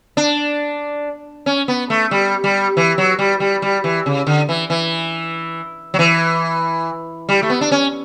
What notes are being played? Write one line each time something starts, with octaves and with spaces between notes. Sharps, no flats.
D4
C#4
B3
A3
G3
G3
E3
F#3
G3
G3
G3
E3
C#3
D3
E3
E3
F#3
E3
G3
A3
B3
D4
C#4